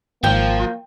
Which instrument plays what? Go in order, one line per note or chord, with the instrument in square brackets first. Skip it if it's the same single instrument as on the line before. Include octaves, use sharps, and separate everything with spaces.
[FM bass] G#1 [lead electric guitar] F3 [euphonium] A#3 [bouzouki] G5